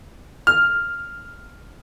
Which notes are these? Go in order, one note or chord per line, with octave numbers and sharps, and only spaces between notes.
F6